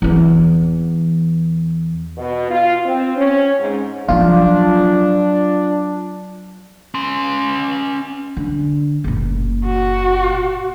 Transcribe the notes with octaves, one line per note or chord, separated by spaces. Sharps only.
E2 E3
B2
F4
C4
C#4
G#2
F3 F#3 D4 F4
C#4 C6
D3
F#1 A#2
F#4